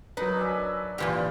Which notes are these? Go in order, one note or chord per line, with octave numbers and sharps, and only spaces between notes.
F#3 D#4 A#4 B4
D4 E5 G#5
A#2 E3 F4 G4 C5 F5